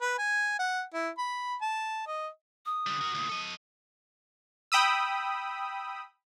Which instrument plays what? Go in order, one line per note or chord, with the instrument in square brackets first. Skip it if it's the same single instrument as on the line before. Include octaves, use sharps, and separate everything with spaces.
[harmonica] B4
G#5
F#5
E4
B5
A5
D#5
[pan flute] D#6
[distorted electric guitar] D3 G3
F#4 A#4
D2 A#2
A4 D#5
[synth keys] G5 B5 D#6 E6